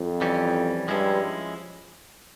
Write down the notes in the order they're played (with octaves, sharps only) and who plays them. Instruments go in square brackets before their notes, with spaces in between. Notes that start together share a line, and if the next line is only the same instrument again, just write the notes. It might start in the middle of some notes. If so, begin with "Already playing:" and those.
Already playing: [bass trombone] F2
[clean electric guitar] E3 G3 C#4
[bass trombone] G2 [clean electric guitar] F3 G#3 C#4 E4